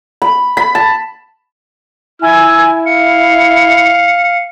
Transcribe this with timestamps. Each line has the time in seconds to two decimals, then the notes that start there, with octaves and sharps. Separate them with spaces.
0.22 B5
0.57 B5
0.75 A5
2.22 E4 G#5 E6
2.86 F5 C#7